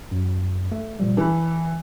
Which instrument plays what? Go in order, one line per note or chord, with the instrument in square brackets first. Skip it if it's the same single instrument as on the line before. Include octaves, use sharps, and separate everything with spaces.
[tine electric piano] F#2
A3
A#2 F3 G3
[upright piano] E3 [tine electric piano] A5 B5